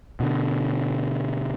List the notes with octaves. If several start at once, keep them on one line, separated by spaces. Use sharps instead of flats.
B2 D3